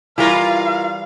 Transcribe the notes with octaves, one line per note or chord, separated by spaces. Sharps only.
E3 G3 E4 F4 A#4 C#5 F5